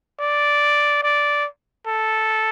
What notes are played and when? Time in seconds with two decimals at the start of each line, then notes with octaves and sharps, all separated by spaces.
0.19 D5
1.03 D5
1.86 A4